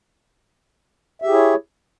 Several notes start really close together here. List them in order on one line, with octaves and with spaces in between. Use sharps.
E5 G4 G#4 E4 C#5